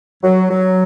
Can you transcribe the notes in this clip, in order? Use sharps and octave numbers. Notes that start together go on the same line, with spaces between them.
F#3
F#3